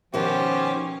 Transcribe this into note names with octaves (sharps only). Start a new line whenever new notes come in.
B2 D#3 F3 B3 C#4 G4